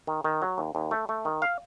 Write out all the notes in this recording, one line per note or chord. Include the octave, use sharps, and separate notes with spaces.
D#3
D#3
F#3
D#2
D#2
A3
A3
D#3
F5